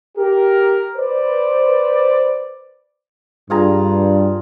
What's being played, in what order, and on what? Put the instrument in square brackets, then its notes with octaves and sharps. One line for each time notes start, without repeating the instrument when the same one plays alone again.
[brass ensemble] G4 A#4
B4 C5 D5
[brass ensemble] G2 [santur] F4 G#4 A#5